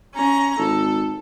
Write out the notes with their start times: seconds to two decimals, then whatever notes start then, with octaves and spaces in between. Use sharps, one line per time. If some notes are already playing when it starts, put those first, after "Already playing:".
0.15 C#4 A#5
0.58 G#1 A4